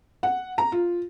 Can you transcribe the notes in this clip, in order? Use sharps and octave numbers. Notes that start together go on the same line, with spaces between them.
F#5
A#5
F4